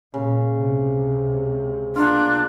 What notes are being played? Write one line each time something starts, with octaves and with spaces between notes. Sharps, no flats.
A#2 C#3
C#2 C3
A#3 B3 D4 F4